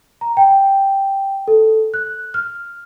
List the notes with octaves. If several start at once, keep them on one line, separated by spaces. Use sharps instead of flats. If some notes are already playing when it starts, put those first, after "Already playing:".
A#5
G5
A4
F#6
F6